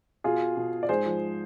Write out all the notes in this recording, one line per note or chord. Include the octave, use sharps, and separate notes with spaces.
B2 F4 G#4
B2
D5
G#2 G#4 C5
F3